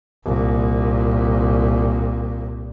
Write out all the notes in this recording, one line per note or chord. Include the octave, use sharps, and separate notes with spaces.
C2 A#2